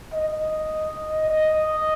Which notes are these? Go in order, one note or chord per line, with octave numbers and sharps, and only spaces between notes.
D#5
D#5